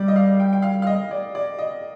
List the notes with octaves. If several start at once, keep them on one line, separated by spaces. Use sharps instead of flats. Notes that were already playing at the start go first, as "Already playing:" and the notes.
Already playing: G3 D5
D#5
F5
G5
G5
F5
F5
D#5
D5
D5
D#5